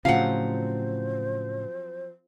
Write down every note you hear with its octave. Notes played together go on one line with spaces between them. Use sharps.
A2 C#3 F3 F#3 C4 C5 F5 F#5